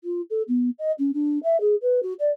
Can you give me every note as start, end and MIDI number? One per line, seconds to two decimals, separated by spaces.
0.04 0.21 65
0.30 0.42 69
0.48 0.69 59
0.78 0.91 75
0.98 1.11 61
1.13 1.38 62
1.43 1.59 76
1.60 1.75 68
1.81 2.00 71
2.02 2.13 66
2.19 2.30 74